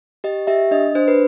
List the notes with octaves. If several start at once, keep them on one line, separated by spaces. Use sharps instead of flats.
G4 D#5
G4 E5
D4 D#5
D4 C5
B4